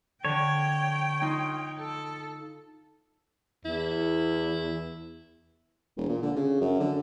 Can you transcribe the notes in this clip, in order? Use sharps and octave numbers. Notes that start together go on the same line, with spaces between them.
D3 C#5 G5
D#4 F4
A4
E2 E4
E1
A#2
D3
C#3
F#2
D3